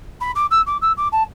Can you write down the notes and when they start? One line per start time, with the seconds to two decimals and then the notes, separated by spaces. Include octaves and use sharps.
0.20 B5
0.35 D6
0.51 E6
0.66 D6
0.81 E6
0.97 D6
1.12 A5